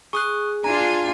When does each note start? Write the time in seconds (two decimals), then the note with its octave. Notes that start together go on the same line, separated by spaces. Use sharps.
0.13 G#4 C#6 D#6 F#6
0.64 D4 F4 G#5 A#5